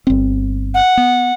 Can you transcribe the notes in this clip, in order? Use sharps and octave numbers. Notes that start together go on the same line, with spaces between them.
G1 C4
F#5
B3